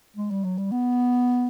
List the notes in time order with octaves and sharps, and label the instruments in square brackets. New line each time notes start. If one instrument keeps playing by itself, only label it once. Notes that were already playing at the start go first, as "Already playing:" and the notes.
[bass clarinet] G#3
G3
F#3
G3
B3